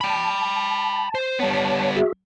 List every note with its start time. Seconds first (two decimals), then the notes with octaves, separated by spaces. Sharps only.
0.01 G5 A5 B5
1.15 C5
1.39 G3 B3 C#5 A5
1.96 F#4 G#4 E5